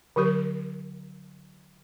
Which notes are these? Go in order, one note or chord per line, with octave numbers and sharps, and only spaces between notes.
D3 F#3 G4 A#4